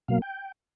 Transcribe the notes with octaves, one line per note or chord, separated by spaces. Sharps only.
B2 F#3 A#3 F5
G5